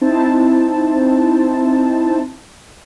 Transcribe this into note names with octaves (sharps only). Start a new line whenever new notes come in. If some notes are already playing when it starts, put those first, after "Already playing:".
C4 D#4 E4 C5 A5